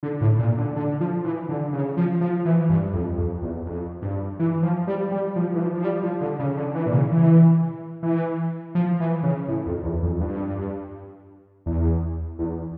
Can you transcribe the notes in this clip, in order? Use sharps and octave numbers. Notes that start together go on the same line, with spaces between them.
D3
A2
A#2
D3
D3
F3
E3
D3
C#3
F3
F3
E3
G2
F2
F2
E2
F2
G2
E3
F3
G3
G3
F3
E3
F3
F3
G3
F3
D3
C#3
D3
E3
A#2
C#3
E3
E3
F3
E3
C#3
A2
F2
E2
F2
G2
E2
E2